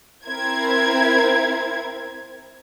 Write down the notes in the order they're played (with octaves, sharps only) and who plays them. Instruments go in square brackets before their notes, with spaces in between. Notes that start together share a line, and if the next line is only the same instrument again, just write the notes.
[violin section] C4 E4 A#4 C5 G#6